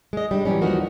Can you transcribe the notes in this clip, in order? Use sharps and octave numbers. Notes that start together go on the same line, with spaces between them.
G#3 D#5
G3 D4
E3 F#3 G3 C4 C#4
D#2 E3 F3 D#4 F#4 A#4